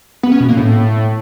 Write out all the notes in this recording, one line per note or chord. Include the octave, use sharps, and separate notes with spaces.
B3
C#4
B2
A#3
A2